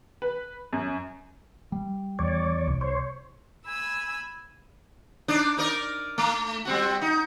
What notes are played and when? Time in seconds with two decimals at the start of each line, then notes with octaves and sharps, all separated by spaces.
0.22 B4
0.73 F#2
1.72 G3
2.19 E2 C#5 D5
2.67 C2 C3
2.81 C5 C#5
3.65 G#5 B5 E6
5.28 D4 D#4 D5
5.57 D#4 A#4 D5
6.18 A3
6.65 G3 C4 F#4
7.02 D#4